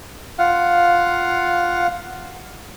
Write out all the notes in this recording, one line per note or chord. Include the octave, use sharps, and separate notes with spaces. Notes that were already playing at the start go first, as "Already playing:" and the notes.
F4 F5 F#5